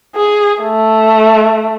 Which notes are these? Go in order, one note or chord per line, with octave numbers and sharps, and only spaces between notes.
G#4
A3